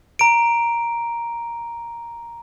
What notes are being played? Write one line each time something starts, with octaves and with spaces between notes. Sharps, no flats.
A#5 D7